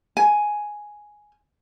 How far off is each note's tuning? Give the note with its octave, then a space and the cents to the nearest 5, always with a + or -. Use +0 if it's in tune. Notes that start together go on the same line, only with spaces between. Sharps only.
G#5 +5